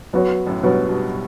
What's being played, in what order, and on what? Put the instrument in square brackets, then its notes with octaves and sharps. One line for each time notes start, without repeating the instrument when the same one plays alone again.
[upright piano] F#2 [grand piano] F#3 B3 F#4 C#5
[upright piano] F#2 A2
[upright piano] G2 B2 [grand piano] F#3 B3 F#4 C#5
[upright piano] G2 B2